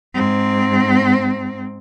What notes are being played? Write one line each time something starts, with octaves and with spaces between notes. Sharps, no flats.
G#2 C4